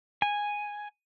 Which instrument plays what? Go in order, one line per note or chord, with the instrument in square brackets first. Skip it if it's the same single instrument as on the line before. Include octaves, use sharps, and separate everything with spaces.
[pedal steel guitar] G#5